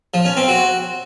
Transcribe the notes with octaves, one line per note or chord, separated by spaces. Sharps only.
F3
C#4
C4
F#4